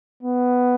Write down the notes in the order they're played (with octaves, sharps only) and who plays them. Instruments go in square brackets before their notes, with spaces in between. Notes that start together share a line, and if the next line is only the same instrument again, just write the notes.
[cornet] B3